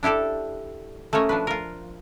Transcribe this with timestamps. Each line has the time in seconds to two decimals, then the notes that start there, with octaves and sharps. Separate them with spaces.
0.03 D4 E4 G4 A4 D5
1.13 A3 A#3 C#4 C#5 D#5
1.29 F3 D4 B4
1.47 F4 A#4